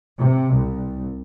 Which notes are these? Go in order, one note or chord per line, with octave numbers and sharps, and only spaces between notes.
C3
C2